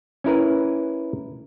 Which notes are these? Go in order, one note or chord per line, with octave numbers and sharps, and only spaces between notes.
C#4 E4 A#4 B4